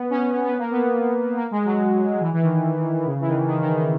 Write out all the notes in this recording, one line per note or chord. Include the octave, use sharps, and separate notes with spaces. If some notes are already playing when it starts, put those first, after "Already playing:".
Already playing: B3
C#4
C#4
B3
A#3
B3
A#3
G#3
F#3
E3
E3
D#3
C#3
E3
D#3
D#3
D#3
D#3